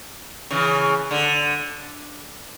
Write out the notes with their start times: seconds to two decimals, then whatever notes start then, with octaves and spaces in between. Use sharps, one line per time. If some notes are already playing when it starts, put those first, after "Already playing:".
0.51 C#3 E3
1.11 D3